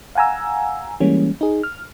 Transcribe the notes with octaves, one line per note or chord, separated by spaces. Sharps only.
F5 F#5 G#5 A#5 E6
E3 G3 G#3 A#3 C#4
D#4 G#4
F6